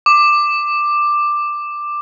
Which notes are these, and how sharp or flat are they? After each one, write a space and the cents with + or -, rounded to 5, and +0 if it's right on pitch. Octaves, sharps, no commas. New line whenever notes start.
D6 +10